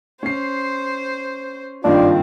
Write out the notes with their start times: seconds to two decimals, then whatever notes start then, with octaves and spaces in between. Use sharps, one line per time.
0.23 C#4 C5 C7
1.84 F#1 G2 D#3 C4 D4 F4